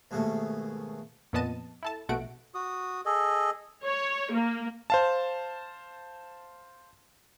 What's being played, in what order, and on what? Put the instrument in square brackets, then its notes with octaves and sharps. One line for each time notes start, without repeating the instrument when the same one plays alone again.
[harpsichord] D#2 G#2 B2 G#3 A3
[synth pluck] F2 A#2 B3 D#5 A5 D#7
E4 A4 A5
A#1 B2 A3 F#4 D7
[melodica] F#4 D#6
G#4 A4 D#5
[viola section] C#5
A#3
[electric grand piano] C5 F5 A5